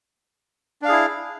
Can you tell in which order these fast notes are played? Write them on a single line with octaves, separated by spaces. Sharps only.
D4 F5 G#4 E4